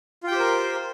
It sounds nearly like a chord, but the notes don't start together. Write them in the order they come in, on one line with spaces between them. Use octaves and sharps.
F4 G5 G4 C5 A#4